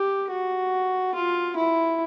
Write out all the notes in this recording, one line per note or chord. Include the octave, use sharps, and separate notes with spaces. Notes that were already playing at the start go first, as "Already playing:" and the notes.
Already playing: G4
F#4
F4
E4